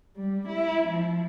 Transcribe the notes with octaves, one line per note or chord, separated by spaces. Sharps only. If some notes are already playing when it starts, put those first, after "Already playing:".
G3
E4
F3